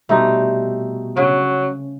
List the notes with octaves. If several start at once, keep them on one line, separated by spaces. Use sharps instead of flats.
B2 G3 A3 B3 C4 D#4 F#4
C#3 F#3